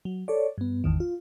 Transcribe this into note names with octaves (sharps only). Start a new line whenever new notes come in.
F#3
A4 C#5 D5
G2 B3
G#1 E2 D#3
F4